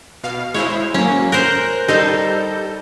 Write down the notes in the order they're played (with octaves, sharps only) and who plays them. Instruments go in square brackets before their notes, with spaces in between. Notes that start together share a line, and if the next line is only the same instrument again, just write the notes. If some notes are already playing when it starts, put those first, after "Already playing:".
[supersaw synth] B2 F5
[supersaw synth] G#3 E4 C5 [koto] C#5
[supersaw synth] F#3 A#3 [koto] C#4
[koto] A#4 C5 [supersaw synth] F#6 G6 A#6
[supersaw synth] G3 A4 G6 [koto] D#4 C5